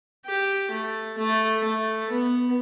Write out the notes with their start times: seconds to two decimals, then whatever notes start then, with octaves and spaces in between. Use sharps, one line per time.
0.26 G4
0.71 A3
1.18 A3
1.64 A3
2.10 B3